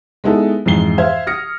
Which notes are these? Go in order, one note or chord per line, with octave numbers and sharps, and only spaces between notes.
G#3 B3 D#4 E4 A4
F2 G#2 E3 C7 G7
C5 E5 F5 G#6
D#6 F6 A#6 C#7